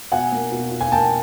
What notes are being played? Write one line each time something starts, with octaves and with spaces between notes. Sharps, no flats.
B2 F#5 G#5
A#3
B2
B2
G#5
A#3 G5 A5